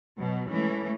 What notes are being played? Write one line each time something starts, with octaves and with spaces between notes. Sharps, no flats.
B2 F#3
E3 G#3 A3 C#4